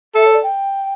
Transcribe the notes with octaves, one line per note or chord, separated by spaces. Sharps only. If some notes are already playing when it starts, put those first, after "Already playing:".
A4 E5
C#5
D5
G5